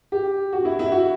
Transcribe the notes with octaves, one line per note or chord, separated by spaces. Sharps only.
G4
F#4
E4
E4
F#4